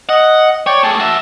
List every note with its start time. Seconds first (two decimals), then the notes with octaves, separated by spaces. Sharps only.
0.09 D#5 F#5
0.67 C#5 D5 G5
0.83 A3 G#4 A5
1.00 F#4 E5